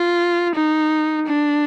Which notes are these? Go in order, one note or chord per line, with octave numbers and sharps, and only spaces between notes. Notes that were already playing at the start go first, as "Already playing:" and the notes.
Already playing: F4
D#4
D4